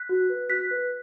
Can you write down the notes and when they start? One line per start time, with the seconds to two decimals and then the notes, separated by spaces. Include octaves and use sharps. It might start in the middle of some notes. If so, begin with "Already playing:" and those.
Already playing: F#6 B6
0.09 F#4
0.30 B4
0.49 F#4 F#6 B6
0.71 B4